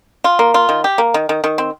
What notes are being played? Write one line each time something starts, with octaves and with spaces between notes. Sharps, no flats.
F4
A#3
F4
D#3
G4
A#3
D#3
D#3
D#3
C4